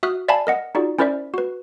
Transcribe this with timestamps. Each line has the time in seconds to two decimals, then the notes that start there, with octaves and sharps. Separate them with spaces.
0.03 F#4 E5 D#6 F6 F#6
0.28 D5 E5 F5 G#5 A5 B5
0.47 A#4 D#5 F#5
0.75 D#4 F4 F#4 G#4 D5
0.99 C#4 E4 A#4 C5 D5 E5
1.34 F#4 B4